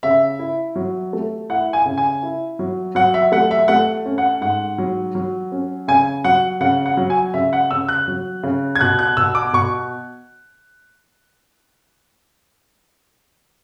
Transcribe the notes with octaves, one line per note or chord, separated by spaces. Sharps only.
C#3 E5
E4
F#3
A3
E4 F#5
G#5
C#3
G#5
E4
F#3
F#3 F#5
E5
A3 F#5
E5
A3 F#5
C#4
F#5
G#2 F#5
F#3
F#3
C#4
C#3 G#5
F#3 F#5
C#3 F#5
F#5
F#3
G#5
C#3 E5
F#5
C#3 E6
F#6
F#3
C#3
G#6
B2 F#6
F#6
B2 E6
D6
B2 C#6